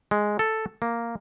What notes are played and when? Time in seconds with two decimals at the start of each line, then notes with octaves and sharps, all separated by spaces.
0.11 G#3
0.39 A4
0.82 A#3